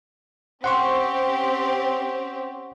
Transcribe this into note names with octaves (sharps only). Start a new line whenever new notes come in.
C4 C#4 G4 F#5 C6 C#6